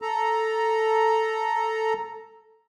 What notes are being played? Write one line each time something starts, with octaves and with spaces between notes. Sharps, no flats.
A4 A#5